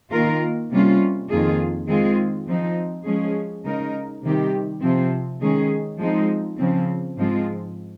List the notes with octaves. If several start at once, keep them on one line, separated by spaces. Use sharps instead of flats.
D#3 A#3 F4 A#4
C3 G3 A#3 C#4 F4
F2 D#3 A#3 F4 G#4
D#3 G#3 C4 F4 G#4
F3 C4 D#4
F3 G#3 C#4 G#4
C#3 G#3 D#4 A#4
C3 D#3 G3 C4 G4
C3 F3 C4
D#3 G#3 C#4 G#4
F3 G#3 C4 D#4
C#3 F3 C4
G#2 F3 G#3 C4 F4